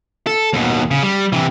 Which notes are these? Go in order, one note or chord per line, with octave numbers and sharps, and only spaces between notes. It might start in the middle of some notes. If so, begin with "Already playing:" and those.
A4
D#2 B2
C#3
G3
C3 E3